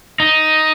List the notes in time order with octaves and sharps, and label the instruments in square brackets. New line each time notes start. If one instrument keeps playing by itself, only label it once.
[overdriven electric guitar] D#4